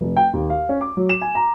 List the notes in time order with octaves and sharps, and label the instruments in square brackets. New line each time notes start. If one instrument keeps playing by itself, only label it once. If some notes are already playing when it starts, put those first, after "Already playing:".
[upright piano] F1
G5
D#2
F5
C#4
D6
F#3
E7
G#5
A#5